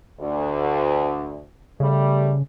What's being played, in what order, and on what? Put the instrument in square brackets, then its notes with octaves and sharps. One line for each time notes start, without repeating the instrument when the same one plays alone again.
[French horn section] D2
[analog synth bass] C#3 [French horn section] G3 A3